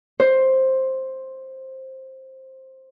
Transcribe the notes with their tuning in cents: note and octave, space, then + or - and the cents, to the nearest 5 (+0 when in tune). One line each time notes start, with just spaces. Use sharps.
C5 +10